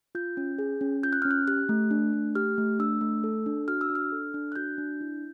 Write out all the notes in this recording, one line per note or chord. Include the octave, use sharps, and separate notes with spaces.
F4 G6
C#4
G#4
C#4
F4 G6
F#6
C#4 F6
F#6
G4 F#6
A3
D4
A3
G4 F6
A3
D4 E6
A3
A4
D4
F#4 F6
E6
D4
F6
A4
D4
F#6
F#4 G6
D4
E4